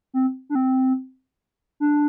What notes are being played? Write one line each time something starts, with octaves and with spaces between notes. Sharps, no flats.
C4
D4
C4
D4